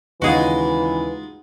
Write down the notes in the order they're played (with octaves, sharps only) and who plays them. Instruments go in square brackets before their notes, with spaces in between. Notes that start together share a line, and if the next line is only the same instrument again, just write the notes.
[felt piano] D#2 C#3 [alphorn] E3 [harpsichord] G#3 D#4 F4 [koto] F#4 G#4